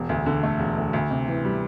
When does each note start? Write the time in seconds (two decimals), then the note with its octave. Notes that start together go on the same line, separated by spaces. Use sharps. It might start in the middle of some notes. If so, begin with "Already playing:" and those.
Already playing: E1
0.09 D2
0.26 D3
0.43 A3
0.60 E1
0.78 D2
0.93 D2
1.11 C3
1.28 E3
1.45 G3